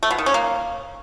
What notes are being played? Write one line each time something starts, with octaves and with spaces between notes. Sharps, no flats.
A3
B2
D#3
C#4
A#3